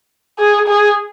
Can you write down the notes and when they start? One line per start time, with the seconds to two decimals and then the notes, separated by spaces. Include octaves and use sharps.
0.39 G#4
0.68 G#4